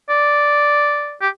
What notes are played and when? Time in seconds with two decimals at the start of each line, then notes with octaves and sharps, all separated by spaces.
0.09 D5
1.21 G4